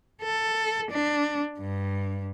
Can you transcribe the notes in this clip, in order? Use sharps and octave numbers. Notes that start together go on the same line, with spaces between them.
A4
D4
G2